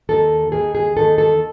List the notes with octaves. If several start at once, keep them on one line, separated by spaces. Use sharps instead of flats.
D#2 D#3 A4
D#2 D#3 G#4
G#4
D#2 D#3 A4
A4